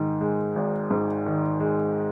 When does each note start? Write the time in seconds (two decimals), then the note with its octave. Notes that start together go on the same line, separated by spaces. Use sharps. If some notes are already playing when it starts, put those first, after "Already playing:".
Already playing: G#2 D#3
0.21 G#3
0.56 G#1
0.91 G#2
1.26 D#3
1.60 G#3